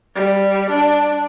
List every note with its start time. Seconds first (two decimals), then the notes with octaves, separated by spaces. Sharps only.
0.15 G3
0.70 D4